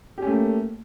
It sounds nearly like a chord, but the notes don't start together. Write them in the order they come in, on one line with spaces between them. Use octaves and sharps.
G4 C#4 A3 A#3